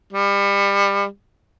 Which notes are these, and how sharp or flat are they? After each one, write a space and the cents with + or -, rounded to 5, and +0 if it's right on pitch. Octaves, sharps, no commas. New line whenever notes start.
G3 +30